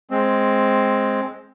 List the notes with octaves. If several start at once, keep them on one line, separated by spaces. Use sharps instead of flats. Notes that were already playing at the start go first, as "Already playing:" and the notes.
G#3 C4